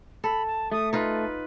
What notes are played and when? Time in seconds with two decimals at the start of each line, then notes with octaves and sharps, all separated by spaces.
0.24 A4 B5
0.47 A5
0.72 A3 D#6
0.93 D#4 F4 B4